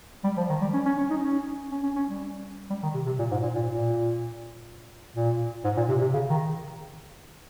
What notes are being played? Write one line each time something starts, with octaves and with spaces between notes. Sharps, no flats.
G3
F3
D#3
G3
C#4
C#4
C#4
D#4
C#4
C#4
C#4
C#4
G3
G3
D#3
C3
C3
A#2
G#2
A#2
A#2
A#2
A#2
G#2
A#2
C3
C3
C#3
D#3